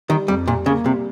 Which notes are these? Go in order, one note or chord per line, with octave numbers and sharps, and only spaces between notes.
D#3 G3
F2 G3
A#2 G3
C#3 A#3
C3 G3